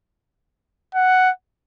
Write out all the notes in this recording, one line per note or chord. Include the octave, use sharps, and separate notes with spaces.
F#5